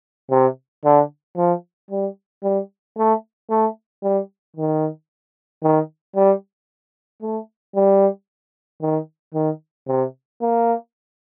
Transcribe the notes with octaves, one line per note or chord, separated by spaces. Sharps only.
C3
D3
F3
G3
G3
A3
A3
G3
D#3
D#3
G3
A3
G3
D#3
D#3
C3
A#3